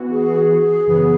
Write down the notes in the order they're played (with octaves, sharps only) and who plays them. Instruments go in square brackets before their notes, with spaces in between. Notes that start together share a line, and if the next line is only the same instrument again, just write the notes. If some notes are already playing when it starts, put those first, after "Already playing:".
Already playing: [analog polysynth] E3 B3 F#4
[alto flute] G#4
[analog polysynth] F#2 C#3 E3 B3